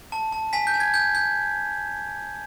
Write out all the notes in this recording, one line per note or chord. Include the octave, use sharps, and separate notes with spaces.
A5
A5
G#5 B6
G6
G#5
G#6
G6
G6